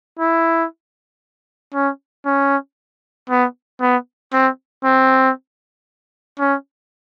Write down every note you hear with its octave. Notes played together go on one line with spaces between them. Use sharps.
E4
C#4
C#4
B3
B3
C4
C4
C#4